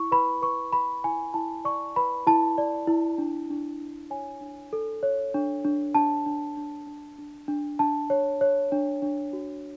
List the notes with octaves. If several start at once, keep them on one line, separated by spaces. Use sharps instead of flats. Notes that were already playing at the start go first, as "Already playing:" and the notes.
Already playing: E4 C#6
B4 B5
B4 C#6
B4 B5
E4 G#5
E4 A5
D5 C#6
B4 B5
E4 A5
D5
E4
D4
D4
D4
C#5 G#5
D4
A4
C#5
D4
D4
D4 A5
D4
D4
D4
D4
D4
D4 A5
C#5
C#5
D4
D4
F#4